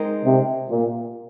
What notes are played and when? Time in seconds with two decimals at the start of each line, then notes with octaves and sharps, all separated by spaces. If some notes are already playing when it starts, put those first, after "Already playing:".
Already playing: G#3 C4 D#4 A#4 D#5
0.24 C3
0.70 A#2